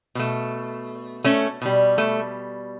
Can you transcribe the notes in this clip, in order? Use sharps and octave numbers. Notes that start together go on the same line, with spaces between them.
B2 A3
A3 C#4
B2 G3
A3